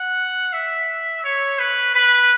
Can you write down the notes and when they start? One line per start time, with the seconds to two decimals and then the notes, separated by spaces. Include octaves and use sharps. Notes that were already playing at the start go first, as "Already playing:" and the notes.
Already playing: F#5
0.53 E5
1.24 C#5
1.59 B4
1.95 B4